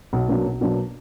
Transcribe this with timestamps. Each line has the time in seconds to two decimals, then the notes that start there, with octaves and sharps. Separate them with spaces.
0.13 B1
0.28 B2 F#3 A#3 D4
0.45 B1
0.61 B2 F#3 A#3 D4